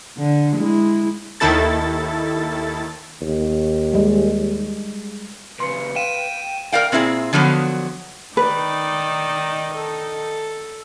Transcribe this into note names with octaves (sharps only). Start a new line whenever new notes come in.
D3
G#3 E4
D#2 D#3 E4 A4 A6
D#2
G3 G#3
A#2 C#3 B4 C6 C#7
F5 G5 D#7 E7
A#4 D5 F5 G5
A#2 C4 E4 G4 G#4
D3 F3 F#3 A#3 B3
D#3 D#4 B4 D5 D#5
A4